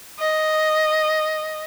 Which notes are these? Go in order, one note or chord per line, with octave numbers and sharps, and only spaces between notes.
D#5